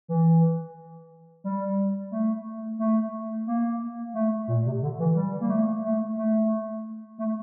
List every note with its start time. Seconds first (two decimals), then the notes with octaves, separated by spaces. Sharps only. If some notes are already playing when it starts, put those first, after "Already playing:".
0.08 E3
1.44 G3
2.11 A3
2.79 A3
3.47 A#3
4.14 A3
4.47 A#2
4.66 C3
4.82 D3
4.99 E3
5.15 G3
5.40 A#3
5.50 A3
5.84 A3
6.17 A3
7.18 A3